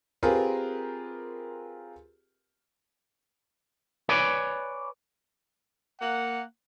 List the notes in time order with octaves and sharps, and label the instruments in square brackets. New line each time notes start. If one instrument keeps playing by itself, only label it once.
[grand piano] C4 F4 G4 G#4 A#4 B4
[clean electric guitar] B4 C#5 D5 G#5 B5
[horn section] A#3 F#5